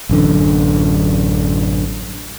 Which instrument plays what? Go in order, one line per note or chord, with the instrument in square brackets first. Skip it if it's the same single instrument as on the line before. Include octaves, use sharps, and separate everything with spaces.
[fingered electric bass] A1 F#2 D3